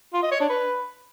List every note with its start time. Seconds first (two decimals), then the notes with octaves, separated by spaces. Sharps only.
0.14 F4
0.23 D#5
0.32 C#5
0.41 D4
0.49 B4